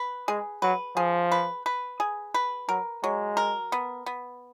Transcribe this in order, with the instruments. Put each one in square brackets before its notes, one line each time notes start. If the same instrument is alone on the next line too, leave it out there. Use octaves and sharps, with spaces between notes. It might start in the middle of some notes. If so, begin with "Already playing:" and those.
Already playing: [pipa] B4
[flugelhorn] G#3 [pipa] G#4
[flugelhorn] F#3 [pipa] B4
[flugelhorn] F3 [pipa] G#4
[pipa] B4
B4
G#4
B4
[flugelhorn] F#3 [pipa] A#4
[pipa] F#3 [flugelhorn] G#3
[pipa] A#4
B3
B3